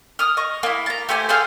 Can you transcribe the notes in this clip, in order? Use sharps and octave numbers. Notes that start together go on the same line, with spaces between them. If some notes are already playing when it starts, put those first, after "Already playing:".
D#6 F6
D#5 C#6
A#3 E4
A5 A#5
A3 G4 C5 G#5
G#4 A4 C5 F5